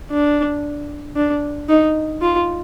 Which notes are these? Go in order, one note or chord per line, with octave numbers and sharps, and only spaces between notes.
D4
D4
D#4
F4